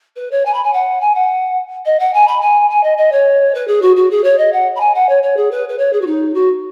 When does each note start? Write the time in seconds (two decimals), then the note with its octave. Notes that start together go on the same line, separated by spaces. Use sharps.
0.16 B4
0.31 C#5
0.45 G#5
0.54 B5
0.64 G#5
0.73 F#5
1.01 G#5
1.15 F#5
1.85 D#5
1.99 F#5
2.14 G#5
2.28 B5
2.41 G#5
2.70 G#5
2.83 D#5
2.98 D#5
3.12 C#5
3.55 B4
3.68 G#4
3.82 F#4
3.96 F#4
4.11 G#4
4.24 C#5
4.38 D#5
4.53 F#5
4.76 B5
4.80 G#5
4.95 F#5
5.09 C#5
5.23 C#5
5.37 G#4
5.51 B4
5.69 B4
5.78 C#5
5.93 G#4
6.01 F#4
6.07 D#4
6.34 F#4